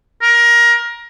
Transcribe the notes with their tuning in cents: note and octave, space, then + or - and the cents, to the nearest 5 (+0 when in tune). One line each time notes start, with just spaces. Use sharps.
A#4 +20